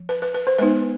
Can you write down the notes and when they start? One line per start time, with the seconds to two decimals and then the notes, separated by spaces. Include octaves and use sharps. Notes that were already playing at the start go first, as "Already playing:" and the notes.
Already playing: F3
0.09 B4
0.22 B4
0.34 B4
0.47 C5
0.58 G#3 B3 D#4 B4